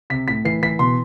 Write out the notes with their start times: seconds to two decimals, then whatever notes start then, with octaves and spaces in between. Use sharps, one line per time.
0.10 C3 B6
0.28 A2 B6
0.45 E3 C7
0.62 E3 B6
0.79 B2 C6